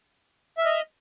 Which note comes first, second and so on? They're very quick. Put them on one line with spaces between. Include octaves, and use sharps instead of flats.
E5 F6 D#5